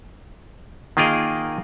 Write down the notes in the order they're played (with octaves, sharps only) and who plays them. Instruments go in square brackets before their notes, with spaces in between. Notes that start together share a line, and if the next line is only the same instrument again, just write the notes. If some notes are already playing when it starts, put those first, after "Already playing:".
[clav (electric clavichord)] D#3 A#3 F4 G#4 A#4 D#5